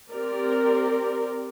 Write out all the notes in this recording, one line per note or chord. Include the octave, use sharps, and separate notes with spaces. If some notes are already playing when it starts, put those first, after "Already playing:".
C4 G4 A#4 D5